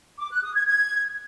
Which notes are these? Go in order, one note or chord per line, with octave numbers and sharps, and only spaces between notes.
D6
F#6
D#6
G#6
G#6